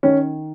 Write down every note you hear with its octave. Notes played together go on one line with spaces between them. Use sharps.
D#3 C#4